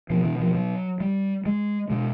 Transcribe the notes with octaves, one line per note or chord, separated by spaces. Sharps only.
B2 F3
E3
F3
F#3
G3
G#3
B2 G#3